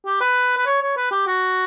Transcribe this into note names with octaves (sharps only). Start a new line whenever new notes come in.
G4
B4
B4
C#5
C#5
B4
G4
F#4